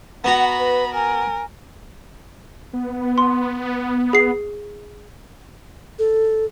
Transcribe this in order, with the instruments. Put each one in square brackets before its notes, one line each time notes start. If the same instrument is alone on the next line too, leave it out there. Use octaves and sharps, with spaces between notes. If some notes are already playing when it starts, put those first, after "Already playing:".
[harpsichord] B3 F#4 A#5 [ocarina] F#5 [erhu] B5
[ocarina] B4
[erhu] A#4 [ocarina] G#5
[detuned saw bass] B3
[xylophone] C6
G#4 C7
[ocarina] A4